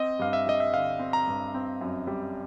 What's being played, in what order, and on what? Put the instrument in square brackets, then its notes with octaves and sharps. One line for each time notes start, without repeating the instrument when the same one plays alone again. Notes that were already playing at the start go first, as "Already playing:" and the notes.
Already playing: [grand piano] C4 [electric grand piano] D#5
[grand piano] G2 [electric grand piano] F5
[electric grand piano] E5
[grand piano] G3 [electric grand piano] D#5
[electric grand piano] E5
[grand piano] D3 [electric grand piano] F5
[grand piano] C4
[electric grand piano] A#5
[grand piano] G2
C4
F#2
G3